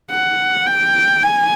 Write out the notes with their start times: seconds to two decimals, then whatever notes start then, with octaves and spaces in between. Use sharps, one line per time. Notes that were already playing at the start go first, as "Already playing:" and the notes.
0.11 F#5
0.67 G5
1.23 G#5